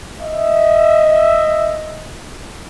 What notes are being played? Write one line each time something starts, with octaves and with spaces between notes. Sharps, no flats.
D#5 E5